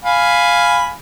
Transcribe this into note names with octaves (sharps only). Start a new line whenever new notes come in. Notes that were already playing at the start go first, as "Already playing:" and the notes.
F5 G#5 B5